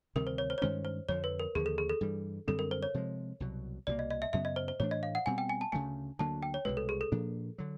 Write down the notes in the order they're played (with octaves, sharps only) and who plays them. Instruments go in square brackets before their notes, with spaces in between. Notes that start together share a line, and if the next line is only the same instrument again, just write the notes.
[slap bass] D2 C3 D#3 G3 [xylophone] A#4
[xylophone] C5
C#5
C5
C#5
[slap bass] G2 D#3 G#3 C#4 [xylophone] C5
[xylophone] C5
[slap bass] F2 D3 F3 [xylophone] C#5
[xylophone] B4
A#4
[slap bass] D#2 D3 F3 [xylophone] G#4
[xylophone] A4
G#4
A4
[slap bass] G2 E3 G3
[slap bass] F#2 D3 G3 C4 [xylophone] A4
[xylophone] A#4
C5
C#5
[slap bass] C3 F3 G#3
C2 B2 F#3
[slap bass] C2 B2 F#3 A#3 [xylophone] D5
[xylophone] D#5
D#5
E5
[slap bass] F#2 C#3 F#3 B3 [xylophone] E5
[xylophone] D#5
C5
C5
[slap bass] A2 E3 A3 D4 [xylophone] C#5
[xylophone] D#5
F5
F#5
[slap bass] B2 G3 C4 [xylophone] G#5
[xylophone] G5
G#5
A5
[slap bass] D2 C#3 F3 A3 [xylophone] G#5
[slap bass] D2 D3 F#3 A#3 [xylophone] A5
[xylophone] G5
C#5
[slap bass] C2 B2 G#3 [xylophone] B4
[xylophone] A4
G#4
A4
[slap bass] A#2 F3 A#3 D4
D3 F#3